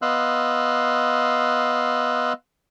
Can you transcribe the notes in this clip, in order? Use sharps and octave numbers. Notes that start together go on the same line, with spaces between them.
B3 D#5 F5 C6 E6 F#6